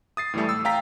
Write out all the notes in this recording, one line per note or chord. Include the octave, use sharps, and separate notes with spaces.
D#6 A6 C7
A2 E3 G3 A3
E6
F5 G5 A#5 B6